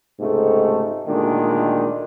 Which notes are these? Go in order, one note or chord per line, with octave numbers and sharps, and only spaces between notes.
C#2 G#2 C3 A3
D2 A#2 D#3 G#3 D4